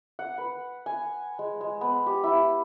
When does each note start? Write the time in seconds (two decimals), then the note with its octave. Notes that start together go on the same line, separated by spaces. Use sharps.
0.19 F#5
0.38 B4
0.86 G#5
1.39 G#3
1.61 G#3
1.81 B3
2.06 G4
2.24 E4